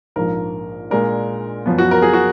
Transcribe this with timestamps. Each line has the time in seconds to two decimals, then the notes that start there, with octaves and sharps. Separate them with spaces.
0.16 A#1 G#2 F3 A#4
0.90 A#2 G#3 D4 A#4
1.66 F#2 F3 B3
1.78 F#4
1.91 A#4
2.02 G#4
2.13 F#4